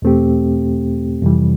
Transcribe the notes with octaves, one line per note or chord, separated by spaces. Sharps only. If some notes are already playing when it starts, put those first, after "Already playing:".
E2 B2 A3 C4 G4
F2 C3 E3 G3